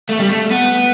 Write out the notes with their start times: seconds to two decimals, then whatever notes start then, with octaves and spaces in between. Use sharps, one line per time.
0.09 A3
0.20 G3
0.29 A3
0.51 B3